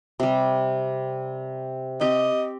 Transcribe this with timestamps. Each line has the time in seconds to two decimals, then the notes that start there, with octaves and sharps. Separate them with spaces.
0.20 C3 G3
2.01 C4 G4 D#5